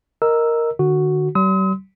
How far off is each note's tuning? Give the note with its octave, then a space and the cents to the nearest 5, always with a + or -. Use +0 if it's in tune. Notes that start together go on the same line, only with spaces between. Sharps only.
A#4 +0 D#5 +0 E6 +0
D3 +40 F#4 +0
G3 -45 C6 -30 D#6 +45